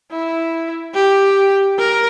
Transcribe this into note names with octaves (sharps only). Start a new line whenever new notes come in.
E4
G4
A#4